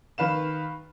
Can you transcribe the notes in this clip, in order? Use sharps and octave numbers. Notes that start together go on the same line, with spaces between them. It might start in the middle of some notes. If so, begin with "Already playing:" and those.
D#3 B4 F5 E7